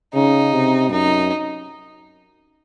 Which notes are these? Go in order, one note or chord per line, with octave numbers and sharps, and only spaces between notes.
C#3 D#4
C3
F#2 D#4